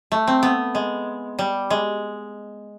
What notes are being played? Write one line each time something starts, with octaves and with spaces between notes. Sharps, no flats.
A3
C4
B3
G#3
G3
G#3